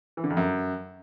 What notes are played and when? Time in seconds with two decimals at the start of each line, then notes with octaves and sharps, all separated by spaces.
0.17 E3
0.24 D3
0.30 F2
0.37 F#2